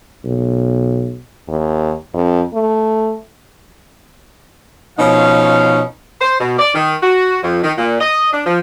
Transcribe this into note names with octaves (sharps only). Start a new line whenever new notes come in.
B1
D#2
F2
A3
B2 F3 C#4 D#4 F5
C5
B2
D5
D#3
F#4
F2
D#3
A#2
D#5
D4
F3